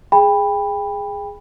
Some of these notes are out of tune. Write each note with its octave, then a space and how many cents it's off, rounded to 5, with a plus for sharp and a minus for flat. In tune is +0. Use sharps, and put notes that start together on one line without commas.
G#4 +0 G5 +30 B5 +0